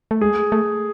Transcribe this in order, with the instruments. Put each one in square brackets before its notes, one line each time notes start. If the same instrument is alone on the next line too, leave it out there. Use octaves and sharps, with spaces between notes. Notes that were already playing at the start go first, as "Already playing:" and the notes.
[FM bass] A3
[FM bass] G#3 [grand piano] G#4
[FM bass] A3